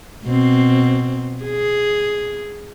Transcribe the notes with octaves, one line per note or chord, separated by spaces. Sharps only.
B2 C4
G#4